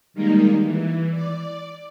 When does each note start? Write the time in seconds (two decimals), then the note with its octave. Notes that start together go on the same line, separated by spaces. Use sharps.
0.14 D#3 G3 G#3 A#3 D#4
0.62 E3
1.11 D5